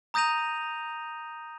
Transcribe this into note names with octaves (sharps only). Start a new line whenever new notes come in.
A#5 D#6 G6 A#6 D#7 F7